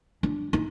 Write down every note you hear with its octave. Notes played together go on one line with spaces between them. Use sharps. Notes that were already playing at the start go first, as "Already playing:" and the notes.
D4
D#4